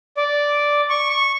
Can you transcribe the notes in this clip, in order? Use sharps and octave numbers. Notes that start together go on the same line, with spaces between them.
D5
C#6
C#6